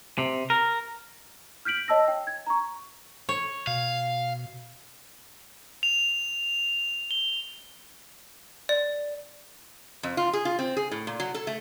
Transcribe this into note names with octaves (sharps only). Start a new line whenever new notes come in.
C3
A#4
F6 G6 B6 D7 F#7
C#5 D#5 A5 E6 A#6
G5
G#6
A#5 C#6
C#5
B2 F5
F7
G7
D5
F2
F4
G#4
F4
C4
G#4
A2
A#2
F#3
A4
A3